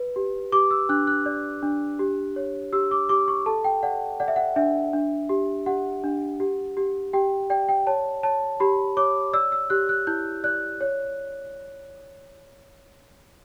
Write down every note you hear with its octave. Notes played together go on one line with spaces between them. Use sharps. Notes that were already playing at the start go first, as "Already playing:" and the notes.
Already playing: B4
G4
G4 D6
E6
D4 F#6
F#6
D5
D4
G4
C#5
G4 E6
D6
G4 D6
C#6
A4 A5
G5
D5 F#5
D5 F#5
E5
F#5
D4 E5
D4
G4
G4 F#5
D4
G4
G4
G4 G5
D5 G5
G5
C#5 A5
C#5 A5
G4 B5
C#5 D6
D5 E6
E6
G4 F#6
F#6
E4 G6
D5 F#6
C#5